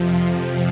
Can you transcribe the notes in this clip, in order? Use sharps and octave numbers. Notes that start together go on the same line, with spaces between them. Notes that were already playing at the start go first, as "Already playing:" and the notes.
Already playing: F2 C3 F3